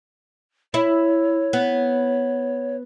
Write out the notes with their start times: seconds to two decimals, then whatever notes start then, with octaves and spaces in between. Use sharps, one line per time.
0.74 E4 C#5
1.53 B3